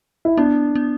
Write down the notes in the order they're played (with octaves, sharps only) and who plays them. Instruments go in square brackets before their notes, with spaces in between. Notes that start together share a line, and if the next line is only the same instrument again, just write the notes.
[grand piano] E4
[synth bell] B3 [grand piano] D4
[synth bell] B3